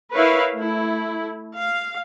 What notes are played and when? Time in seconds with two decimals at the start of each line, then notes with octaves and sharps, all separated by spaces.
0.14 E4 A#4 B4 C#5 E5 F5
0.56 A3 E4
1.57 F5